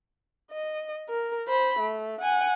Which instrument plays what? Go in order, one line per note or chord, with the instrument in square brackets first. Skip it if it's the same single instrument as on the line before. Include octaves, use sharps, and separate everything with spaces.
[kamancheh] D#5
A#4
C5 B5
A3
F#5 G#5